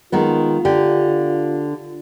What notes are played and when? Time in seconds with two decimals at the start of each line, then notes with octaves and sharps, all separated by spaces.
0.12 D#3 G#3 B3 F4
0.65 D3 G4